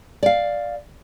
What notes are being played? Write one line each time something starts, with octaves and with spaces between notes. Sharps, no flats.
D5 F5